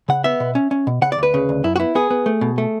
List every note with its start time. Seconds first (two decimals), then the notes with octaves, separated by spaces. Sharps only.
0.09 C#3 F#5
0.24 B3 E5
0.40 B2
0.55 C#4
0.71 C#4
0.87 B2
1.02 C#3 F#5
1.12 D5
1.18 D2 B4
1.34 C#3
1.49 D2
1.64 F#2 E4
1.76 F#4
1.80 B3 E4
1.95 B3 G#4
2.11 B3
2.26 A3
2.41 B2
2.58 A3